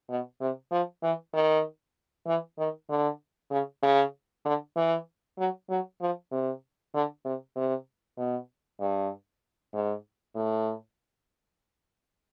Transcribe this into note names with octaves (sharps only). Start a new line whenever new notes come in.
B2
C3
F3
E3
D#3
E3
D#3
D3
C#3
C#3
D3
E3
F#3
F#3
F3
C3
D3
C3
C3
B2
G2
G#2
A2